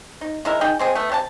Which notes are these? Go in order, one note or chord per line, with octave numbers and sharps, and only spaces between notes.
D#4
G#3 E4 A#4
D#4 G#4 D#5 G5
G#3 C4 G#4
A3 B3
C3 C#4 A5